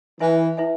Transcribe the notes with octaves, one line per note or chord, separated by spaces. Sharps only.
E3 E4 B4 E5 G#5
E4 B4 E5 G#5